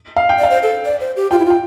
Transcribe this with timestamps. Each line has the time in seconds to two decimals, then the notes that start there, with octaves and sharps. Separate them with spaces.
0.16 F5
0.29 G5
0.39 D5
0.43 F5
0.50 C5
0.63 A4
0.85 D5
1.00 C5
1.17 G4
1.31 F4 G5
1.39 E4
1.45 F4
1.50 G5